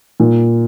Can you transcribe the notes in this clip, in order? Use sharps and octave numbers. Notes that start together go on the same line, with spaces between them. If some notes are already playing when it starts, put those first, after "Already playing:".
A#2